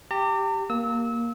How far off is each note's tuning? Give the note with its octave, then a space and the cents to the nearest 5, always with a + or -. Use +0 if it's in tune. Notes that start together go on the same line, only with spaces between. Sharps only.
G4 +0 A#5 -45
A#3 +5 E6 -30